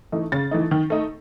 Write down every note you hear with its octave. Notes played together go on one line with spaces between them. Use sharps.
E3 A3 D#4
C#3 A6
E3 A3 D#4
D#3
A3 D#4